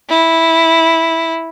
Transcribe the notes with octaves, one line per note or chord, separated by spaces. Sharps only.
E4